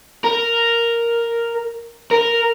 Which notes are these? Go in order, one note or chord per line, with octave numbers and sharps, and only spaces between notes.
A#4
A#4